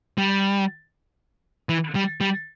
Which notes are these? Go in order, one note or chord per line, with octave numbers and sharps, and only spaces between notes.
G3
E3
G3
G3